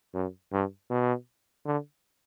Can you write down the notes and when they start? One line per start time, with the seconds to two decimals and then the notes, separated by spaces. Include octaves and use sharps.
0.14 F#2
0.52 G2
0.90 B2
1.65 D3